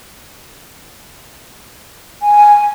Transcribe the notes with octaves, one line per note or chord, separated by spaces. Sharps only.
G#5